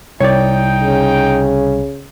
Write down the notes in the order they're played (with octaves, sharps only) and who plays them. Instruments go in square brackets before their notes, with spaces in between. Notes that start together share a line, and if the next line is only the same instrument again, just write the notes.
[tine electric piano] C2 [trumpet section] D#4 G5 [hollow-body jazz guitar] C#5 D5
[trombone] C#3